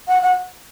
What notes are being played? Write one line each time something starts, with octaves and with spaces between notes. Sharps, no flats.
F#5
F#5